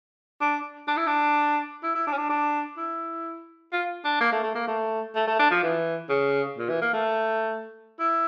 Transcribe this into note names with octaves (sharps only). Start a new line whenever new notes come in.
D4
D4
E4
D4
E4
E4
D4
C#4
D4
D4
E4
F4
D4
A#3
A3
A3
A#3
A3
A3
A3
D4
F3
E3
C#3
A#2
E3
A#3
A3
E4